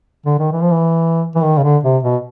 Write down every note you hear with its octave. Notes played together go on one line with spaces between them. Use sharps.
D3
D#3
E3
F3
E3
E3
D#3
C#3
D3
C3
B2